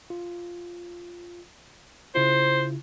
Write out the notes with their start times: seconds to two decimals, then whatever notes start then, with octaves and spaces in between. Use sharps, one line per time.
0.10 F4
2.15 C#3 E4 F4 C5